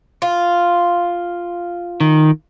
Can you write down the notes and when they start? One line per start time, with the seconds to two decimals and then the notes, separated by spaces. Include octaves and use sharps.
0.22 F4
2.01 D#3